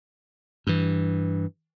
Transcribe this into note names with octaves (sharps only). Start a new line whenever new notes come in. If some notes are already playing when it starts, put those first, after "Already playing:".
G2 E3